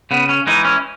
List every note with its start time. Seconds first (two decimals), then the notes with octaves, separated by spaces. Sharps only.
0.11 C#3 B3
0.29 C#4
0.47 E3 G#3 D#4
0.65 C#4